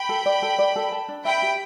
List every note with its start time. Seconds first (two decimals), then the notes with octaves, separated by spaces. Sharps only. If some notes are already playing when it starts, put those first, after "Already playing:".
Already playing: G5 B5
0.09 A4
0.26 D5
0.42 A4
0.59 D5
0.76 A4
0.92 A5
1.08 D4
1.25 E5 G5 B5
1.42 G4